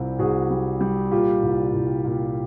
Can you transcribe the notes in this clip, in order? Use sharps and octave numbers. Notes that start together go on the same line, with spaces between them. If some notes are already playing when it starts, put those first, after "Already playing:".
Already playing: C2 G3 C4 F4 G4
C2 F#4 G#4
G3
G3
A#2 F4 G4
C2
C2
A#2